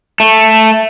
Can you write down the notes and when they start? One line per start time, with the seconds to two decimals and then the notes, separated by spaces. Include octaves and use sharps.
0.20 A3